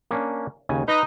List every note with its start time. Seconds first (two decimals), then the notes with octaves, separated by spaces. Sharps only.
0.11 A#3 C#4 D4
0.69 D#2 C#3 G#5
0.88 D#4 B4